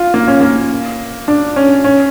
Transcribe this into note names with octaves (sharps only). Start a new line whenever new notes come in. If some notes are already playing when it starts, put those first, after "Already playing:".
Already playing: F4
A#3
C#4
A#3
D4
C#4
C#4